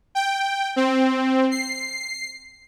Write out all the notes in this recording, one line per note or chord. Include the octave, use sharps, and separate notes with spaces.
G5
C4
C7